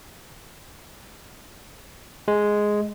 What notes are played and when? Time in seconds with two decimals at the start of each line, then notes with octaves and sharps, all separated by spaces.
2.28 G#3